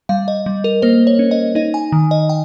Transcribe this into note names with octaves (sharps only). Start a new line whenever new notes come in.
G3 F5
D#5
G3
A#4
A#3 C5
C#5
C#4
D#5
D#4 D#5
G#5
D#3
D#5
G5